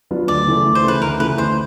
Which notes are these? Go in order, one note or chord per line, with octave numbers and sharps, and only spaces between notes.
F#3 B3 D4 F4
D2 D5
C#3 E3 A3
D2
C5
C#3 E3 A3 B4
D2 A#4
C#3 E3 A3 B4
D2 C5